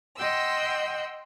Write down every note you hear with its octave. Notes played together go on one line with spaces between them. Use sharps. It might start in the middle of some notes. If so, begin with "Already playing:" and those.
D#5 F#5 G5 C6 E6